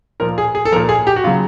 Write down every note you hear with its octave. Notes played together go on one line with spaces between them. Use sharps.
A#2 F3 A#4
G#4
G#4
A4
A#2 F3 A#4
G#4
G4
F#4
C#3 F#3 F4